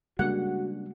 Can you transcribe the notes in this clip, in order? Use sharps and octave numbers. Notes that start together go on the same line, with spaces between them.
C#3 G3 G#3 A#3 D4 F#4 F#5